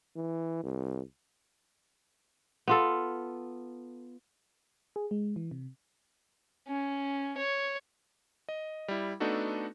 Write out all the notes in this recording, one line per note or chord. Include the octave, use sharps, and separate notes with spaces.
E3
C2
B3 F4 A4
G#4
G#3
E3
C3
C#4
C#5
D#5
G3 E4
A3 B3 D4 D#4 F#4 A4